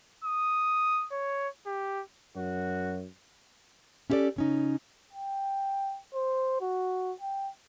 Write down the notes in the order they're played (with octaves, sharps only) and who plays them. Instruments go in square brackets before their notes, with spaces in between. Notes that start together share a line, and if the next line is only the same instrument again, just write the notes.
[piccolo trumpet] D#6
C#5
G4
[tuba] F#2 [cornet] F#4
[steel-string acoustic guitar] C#4 E4 G4 A4 D5
C#3 C#4 D#4
[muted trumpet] G5
C5
F#4
G5